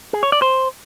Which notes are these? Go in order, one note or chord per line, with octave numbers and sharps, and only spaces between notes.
G#4
C#5
D5
C5